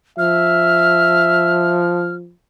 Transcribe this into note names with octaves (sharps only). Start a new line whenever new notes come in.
F3 E5 F6